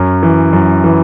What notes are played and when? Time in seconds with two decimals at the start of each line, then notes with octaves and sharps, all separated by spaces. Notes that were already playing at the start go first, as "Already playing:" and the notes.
Already playing: F#2 C#4
0.23 E3
0.53 F#2
0.84 E3